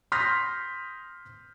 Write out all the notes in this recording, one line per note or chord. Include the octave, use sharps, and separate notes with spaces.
C6 D#6 F6 G6 A#6 B6